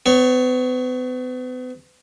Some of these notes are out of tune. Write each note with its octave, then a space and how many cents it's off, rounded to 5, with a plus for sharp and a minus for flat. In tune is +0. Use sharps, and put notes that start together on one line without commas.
B3 +40 C#5 +0